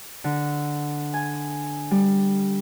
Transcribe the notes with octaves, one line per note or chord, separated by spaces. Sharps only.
D3
G#5
G3